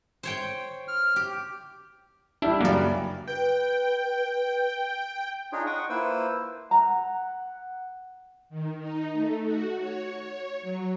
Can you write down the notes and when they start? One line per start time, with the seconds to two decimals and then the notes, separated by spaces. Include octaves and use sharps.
0.23 C5 C#5 G5
0.88 F6
1.16 G4
2.42 G3 D4 E4
2.61 F#2 C#3 G3 A#3 D5
3.28 B4 G5
5.52 D4 D#4 F4 G#4 C#5
5.66 F#5 G5 C#6 D#6
5.90 A#3 E4 F4 B4 C5 E6
6.71 F#5 A#5
8.50 D#3
8.80 D#4
9.13 A3
9.44 F#4
9.79 C#5
10.20 C#5
10.62 F#3